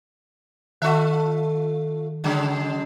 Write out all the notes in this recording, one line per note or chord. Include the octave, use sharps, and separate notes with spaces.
D#3 F4 A4 E5
C#3 F#3 G#3